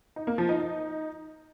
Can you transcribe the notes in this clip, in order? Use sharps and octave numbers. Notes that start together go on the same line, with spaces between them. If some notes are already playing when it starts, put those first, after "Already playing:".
D#4
A#3
F3
D#4
D#4